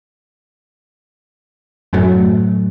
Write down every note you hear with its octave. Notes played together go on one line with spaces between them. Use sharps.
F#2 A2 F#3 A3